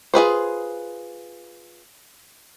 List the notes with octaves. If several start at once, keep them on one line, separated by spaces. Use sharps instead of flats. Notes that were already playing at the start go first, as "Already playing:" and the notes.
F4 G#4 B4 C5